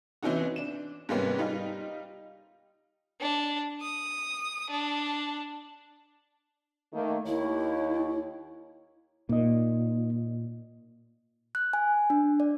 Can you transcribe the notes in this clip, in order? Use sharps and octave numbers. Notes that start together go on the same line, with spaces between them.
E3 C4 C#4 D#4 F#4
D4 E7
G#2 C3 G3 A#3 B3 C#4
G3 D#4 F4
D4
D#6
D4
D#3 A3 A#3
D#2 E4 C#5
A#2 A#3 D#4 D#5
F#6
G#5
D4
D5